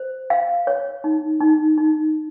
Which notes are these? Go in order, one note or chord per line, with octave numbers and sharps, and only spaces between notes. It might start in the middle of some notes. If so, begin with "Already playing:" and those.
Already playing: C5
F5
C#5
D#4
D#4
D#4